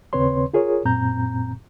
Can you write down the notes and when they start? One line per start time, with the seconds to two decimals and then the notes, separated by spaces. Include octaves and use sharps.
0.13 D#2 C#3 C4 B4 C#5 C6
0.54 F4 G#4 A#4 C#5
0.85 F#2 A#2 C4 A#5 G6